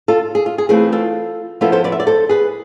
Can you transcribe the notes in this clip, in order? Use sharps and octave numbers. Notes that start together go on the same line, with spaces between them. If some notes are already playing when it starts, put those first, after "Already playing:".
F4 A4
G#4
F4
G#4
E3 A3 C4 F4 G#4 B4
F4 A4
F3 B3 E4 F4 A4
A4 C5
B4 D5
E5
D5
A4 C5
G#4 B4